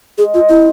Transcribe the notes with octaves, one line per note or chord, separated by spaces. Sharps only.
G#3 G#4
G#3 F4
C3 E4